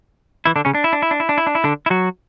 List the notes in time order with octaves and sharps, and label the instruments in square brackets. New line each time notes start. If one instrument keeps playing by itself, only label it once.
[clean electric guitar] E3 E4
D3 D4
C#3 C#4
D4
E4
D4
E4
D4
E4
D4
E4
D4
E4
D3 D4
E4
F#3 F#4